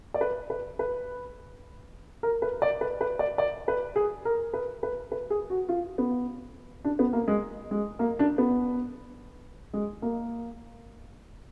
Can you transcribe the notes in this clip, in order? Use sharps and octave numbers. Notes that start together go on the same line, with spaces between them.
D5
B4
B4
B4
A#4
B4
D5
B4
B4
D5
D5
B4
G#4
A#4
B4
B4
B4
G#4
F#4
F4
B3
D4
B3
A#3
G#3
G#3
A#3
D4
B3
G#3
A#3